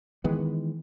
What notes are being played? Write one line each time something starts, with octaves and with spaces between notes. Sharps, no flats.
D#3 E3 G#3 B3